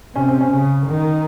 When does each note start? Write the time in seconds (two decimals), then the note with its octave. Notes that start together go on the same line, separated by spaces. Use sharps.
0.15 C3 C#4
0.28 C4
0.41 C#4
0.51 C#3
0.86 D#3